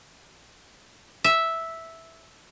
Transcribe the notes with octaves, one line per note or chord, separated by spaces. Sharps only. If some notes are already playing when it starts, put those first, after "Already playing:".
E5